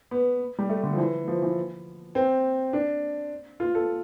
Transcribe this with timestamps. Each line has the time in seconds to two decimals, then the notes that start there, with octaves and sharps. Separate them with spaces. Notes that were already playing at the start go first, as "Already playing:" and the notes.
0.11 B3
0.59 G3
0.69 A3
0.83 D3
0.93 F3
0.98 E3
1.28 F3
1.42 E3
2.15 C4
2.73 D4
3.60 F4
3.75 A4